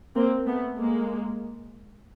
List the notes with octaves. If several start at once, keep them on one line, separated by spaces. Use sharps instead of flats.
A#3 C4
A3 B3
G#3 A#3